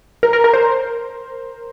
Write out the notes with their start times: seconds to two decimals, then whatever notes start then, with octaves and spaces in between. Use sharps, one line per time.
0.23 A#4
0.33 A#4
0.44 A#4
0.54 C5